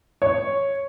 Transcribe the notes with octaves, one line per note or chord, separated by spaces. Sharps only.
C#5